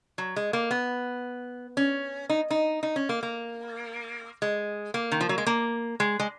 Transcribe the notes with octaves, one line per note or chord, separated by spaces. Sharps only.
F#3
G#3
A#3
B3
C#4
D#4
D#4
D#4
C#4
A#3
A#3
G#3
A#3
D#3
F3
F#3
G#3
A#3
G#3
G#3